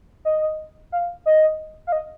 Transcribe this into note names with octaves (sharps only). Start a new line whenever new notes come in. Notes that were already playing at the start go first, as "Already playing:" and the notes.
D#5
F5
D#5
F5
D#5